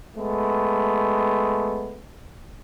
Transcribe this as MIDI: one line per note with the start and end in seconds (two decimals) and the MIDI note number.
0.16 2.01 56
0.16 2.01 57
0.16 2.01 59